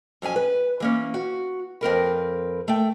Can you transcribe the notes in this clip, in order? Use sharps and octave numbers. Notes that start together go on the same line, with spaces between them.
F2 F#3 C#4 G#5
B4
E3 A#3 C#4
F#4
F2 C4 A#4 B4
A3 G5